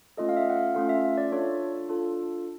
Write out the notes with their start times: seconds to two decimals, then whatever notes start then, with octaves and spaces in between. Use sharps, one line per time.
0.17 A3 C#4 F4 A4 D#5
0.29 F5
0.36 E5
0.50 F#5
0.56 F5
0.75 A3 C#4 F4 A4 F5
0.89 E5
1.18 D5
1.32 D4 F4 A4 C#5
1.89 D4 F4 A4